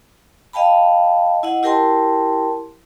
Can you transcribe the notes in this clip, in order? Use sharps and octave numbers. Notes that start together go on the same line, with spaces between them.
D#5 F5 G5 A5 B5
E4 D#5 F#5
E4 G4 A#4 G5 A5 C6